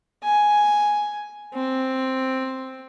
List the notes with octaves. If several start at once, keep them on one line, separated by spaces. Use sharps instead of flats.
G#5
C4